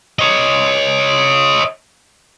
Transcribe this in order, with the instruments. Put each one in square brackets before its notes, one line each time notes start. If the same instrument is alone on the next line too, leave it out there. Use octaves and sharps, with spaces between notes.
[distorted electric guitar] C#5 D#5